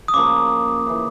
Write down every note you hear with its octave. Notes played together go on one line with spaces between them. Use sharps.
D#6
C#3 F3 A#3 D6
C#3 E3